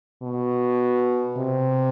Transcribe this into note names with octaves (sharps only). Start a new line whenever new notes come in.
B2
C3